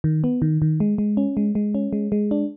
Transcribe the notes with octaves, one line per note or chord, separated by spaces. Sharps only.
D#3
B3
D#3
D#3
G#3
G#3
C#4
G#3
G#3
C#4
G#3
G#3
D4